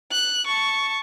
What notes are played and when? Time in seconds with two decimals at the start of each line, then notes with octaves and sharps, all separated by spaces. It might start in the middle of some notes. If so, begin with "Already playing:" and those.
0.12 F#6
0.46 A5 C#6